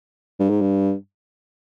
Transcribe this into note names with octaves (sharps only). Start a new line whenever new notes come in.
G2
G#2
G2